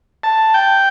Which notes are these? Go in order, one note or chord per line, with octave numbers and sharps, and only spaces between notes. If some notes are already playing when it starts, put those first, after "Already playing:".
A5
G5